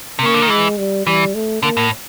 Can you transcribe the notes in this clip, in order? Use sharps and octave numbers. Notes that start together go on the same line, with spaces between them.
C3
C#3 A#3
D3
D#3
E3 G#3
G3
E3 G3
A3
D3 A#3
A2